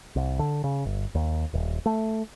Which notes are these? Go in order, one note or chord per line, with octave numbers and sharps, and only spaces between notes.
C2
D3
C#3
G1
D#2
D#1
A3